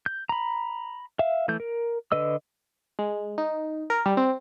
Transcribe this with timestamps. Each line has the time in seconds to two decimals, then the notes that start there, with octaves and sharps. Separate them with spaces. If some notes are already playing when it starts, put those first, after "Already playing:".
0.06 G6
0.29 A#5 B5
1.19 E5 F5
1.48 E3 A3 G6
1.60 A#4
2.12 D3 B4 D#5 E6
2.99 G#3
3.38 D#4
3.90 A#4
4.06 G3
4.17 C4